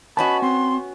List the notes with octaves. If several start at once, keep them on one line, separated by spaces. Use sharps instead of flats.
B3 C#4 F#4 D#5 A5 B5
C4 C6